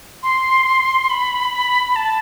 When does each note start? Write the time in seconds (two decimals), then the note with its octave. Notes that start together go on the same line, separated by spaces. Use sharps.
0.23 C6
1.10 B5
1.96 A5